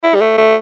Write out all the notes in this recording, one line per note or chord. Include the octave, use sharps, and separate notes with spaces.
E4
G3
A3
A3